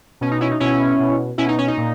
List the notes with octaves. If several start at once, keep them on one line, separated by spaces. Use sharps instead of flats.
B2 C#4
D#4
C#4 E4
D#4
B2 C#4 E4
B2
B2 C#4 E4
D#4
C#4
D#4
A#2